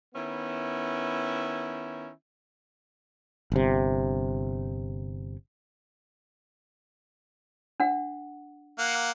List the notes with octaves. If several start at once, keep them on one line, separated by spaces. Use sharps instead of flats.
D#3 B3 C#4 E4
G1 C3
D4 F#5
A#3 F#5